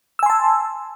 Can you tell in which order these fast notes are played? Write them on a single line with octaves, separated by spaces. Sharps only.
E6 G#5 C6 A5